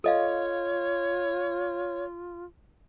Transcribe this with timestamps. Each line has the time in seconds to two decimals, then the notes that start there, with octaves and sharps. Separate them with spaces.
0.04 F4 A4 C#5 D#5 F5